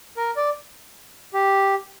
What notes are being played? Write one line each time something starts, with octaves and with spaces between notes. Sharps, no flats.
A#4
D5
G4